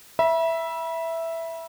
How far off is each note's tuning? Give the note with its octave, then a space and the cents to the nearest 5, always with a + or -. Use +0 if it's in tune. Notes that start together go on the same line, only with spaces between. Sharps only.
E5 +0 B5 -35